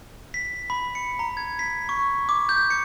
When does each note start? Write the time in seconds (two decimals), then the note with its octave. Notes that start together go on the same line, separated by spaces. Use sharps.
0.34 B6
0.70 B5
0.95 C#7
1.19 A#5
1.37 G#6
1.59 B6
1.89 C#6
2.29 D6
2.49 G6
2.70 C#7